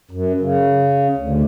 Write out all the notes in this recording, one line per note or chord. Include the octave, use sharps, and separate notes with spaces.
F#2
C#3
D2